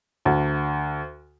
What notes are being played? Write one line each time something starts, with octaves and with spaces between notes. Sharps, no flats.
D2